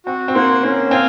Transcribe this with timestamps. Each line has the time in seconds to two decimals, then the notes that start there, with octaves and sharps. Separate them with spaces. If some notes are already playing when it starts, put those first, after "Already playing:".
0.06 C4 F#4
0.28 C4
0.34 A#3 C5 F#5
0.63 A#3 C#4
0.91 C4 F5 G#5